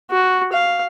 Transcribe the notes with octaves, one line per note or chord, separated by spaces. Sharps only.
F#4
F5